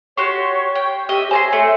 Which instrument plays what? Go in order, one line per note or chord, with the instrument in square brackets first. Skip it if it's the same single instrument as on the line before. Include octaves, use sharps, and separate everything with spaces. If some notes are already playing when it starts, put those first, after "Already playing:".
[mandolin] F#4 G4 C6 [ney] C#5 [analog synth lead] C#6
[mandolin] G5
[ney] G4 [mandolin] D#5 E5
[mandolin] C5 A#5 C6 [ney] C#5 [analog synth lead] G#5
[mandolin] A3